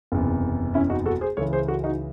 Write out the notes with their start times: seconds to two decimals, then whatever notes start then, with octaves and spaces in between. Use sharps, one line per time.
0.12 F#1 E2 C3
0.74 C#4 E4
0.90 D#4 F#4
1.06 F#4 A4
1.21 G#4 C5
1.37 C#2 C#3 E3 A4 C#5
1.53 G#4 C5
1.68 F#4 A4
1.84 D#4 F#4